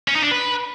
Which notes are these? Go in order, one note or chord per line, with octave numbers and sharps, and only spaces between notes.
C#4
D#4
D4
B4